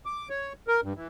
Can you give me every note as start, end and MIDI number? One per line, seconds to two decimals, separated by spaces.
0.06 0.29 86
0.30 0.53 73
0.68 0.81 70
0.83 0.93 43
0.96 1.08 52